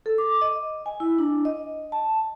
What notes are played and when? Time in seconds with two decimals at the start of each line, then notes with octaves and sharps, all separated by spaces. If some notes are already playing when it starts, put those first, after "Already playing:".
0.06 A4
0.18 D6
0.41 D#5
0.86 G#5
1.00 E4
1.18 D4
1.45 D#5
1.92 A5